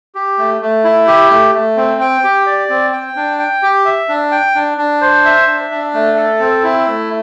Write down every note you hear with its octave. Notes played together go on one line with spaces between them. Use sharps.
G4
A3
A3
E4
G4
A3
A3
C4
G5
G4
D5
C4
G5
D4
G5
G4
E5
D4
G5
D4
D4
C5
E5
D4
D4
A3
A4
C4
E4
A3